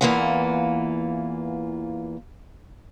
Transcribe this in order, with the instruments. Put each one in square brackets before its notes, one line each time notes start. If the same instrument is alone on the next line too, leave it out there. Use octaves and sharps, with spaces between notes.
[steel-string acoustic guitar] E2 C#3 E3 A#3 F4 F#5